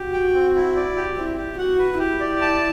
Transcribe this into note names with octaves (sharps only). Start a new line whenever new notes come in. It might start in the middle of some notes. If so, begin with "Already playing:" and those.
Already playing: F#4 G4
G5
C4
E4
D5
G4
C4 E4
G4
F#4 F#5
B4
E4 G4
D5
A5